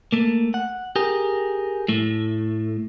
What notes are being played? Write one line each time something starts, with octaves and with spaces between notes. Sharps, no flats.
A3 A#3
F#5
G4 G#4 A#4
A2 A3